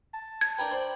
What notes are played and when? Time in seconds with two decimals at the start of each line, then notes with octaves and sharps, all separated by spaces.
0.14 A5
0.41 G#6
0.59 D4 A#4 B4 G5
0.72 C5 D5 B5